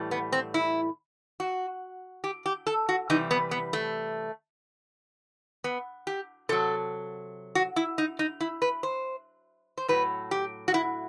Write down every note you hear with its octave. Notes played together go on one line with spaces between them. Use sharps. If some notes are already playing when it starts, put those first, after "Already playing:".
Already playing: A2 E3 G3
B3
C4
E4
F#4
G4
G4
A4
F#4
C3 E3 G3 D#4
B3
B3
A3
B3
G4
C3 F#3 A4
F#4
E4
D#4
D#4
E4
B4
C5
C5
A2 F#3 B4
G4
F#4
E4